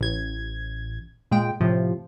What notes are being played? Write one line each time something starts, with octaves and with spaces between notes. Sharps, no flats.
A1 G#6
A#2 G#3 G5
A2 C3 F3